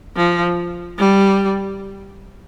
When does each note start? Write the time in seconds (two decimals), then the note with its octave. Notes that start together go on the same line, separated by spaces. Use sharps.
0.17 F3
0.99 G3